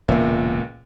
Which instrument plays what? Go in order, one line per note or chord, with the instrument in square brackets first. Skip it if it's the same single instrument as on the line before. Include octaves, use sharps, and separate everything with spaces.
[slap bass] E1 A#3 [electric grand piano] C#2 A#2 E5